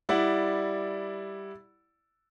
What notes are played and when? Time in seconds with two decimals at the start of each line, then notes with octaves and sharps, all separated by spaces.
0.09 G3 E4 D5 F#5